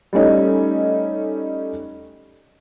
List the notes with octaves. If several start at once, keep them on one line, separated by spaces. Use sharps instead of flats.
G3 A3 C#4 D#4